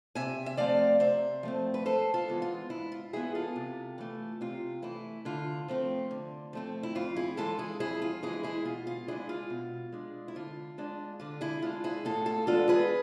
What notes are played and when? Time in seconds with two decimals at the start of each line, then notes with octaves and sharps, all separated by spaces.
0.15 C3 E5 G#5
0.46 E5
0.57 F3 A3 C4 D5 F5
1.00 C3 C5 E5
1.43 F3 A3 C4
1.74 B4
1.85 G#2 A4 C5
2.14 F4 A4
2.28 E3 G#3 B3
2.42 F4
2.70 G#2 E4
2.92 F4
3.13 E3 G#3 B3 E4 G#4
3.35 F4 A4
3.56 C3
3.98 E3 A3
4.41 C3 F4
4.82 E3 A3 E4
5.25 D3 F4
5.68 F3 A3 C4
6.11 D3
6.53 F3 A3 C4
6.83 E4
6.95 F2 F4
7.16 E4 G#4
7.37 E3 G#3 F4 A4
7.58 E4 G#4
7.80 F2 E4 G#4
8.02 F4
8.23 E3 G#3 E4 G#4
8.43 E4 G#4
8.65 B2 F4
8.87 F4
9.08 G#3 D4 E4 G#4
9.29 F4
9.50 B2
9.92 G#3 D4
10.28 E4
10.35 D3 F4
10.78 G#3 D4
11.20 D3 F4
11.41 E4 G#4
11.62 G#3 D4 F4
11.84 E4 G#4
12.05 A2 F4 A4
12.26 F4 A4
12.47 E3 G#3 B3 D4 F4 A4
12.69 G#4 B4